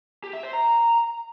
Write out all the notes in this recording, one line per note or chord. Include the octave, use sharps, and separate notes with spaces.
G4
E5
C5
A#5